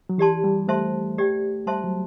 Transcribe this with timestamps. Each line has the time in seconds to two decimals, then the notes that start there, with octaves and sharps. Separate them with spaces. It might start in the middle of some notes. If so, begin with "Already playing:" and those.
0.09 F#3
0.18 E3 G4 D5 A5 C6
0.44 G3
0.68 A3 C5 E5 A5 C6
1.18 G4 D5 G5
1.67 G3 C5 E5 A5 C6
1.84 F#3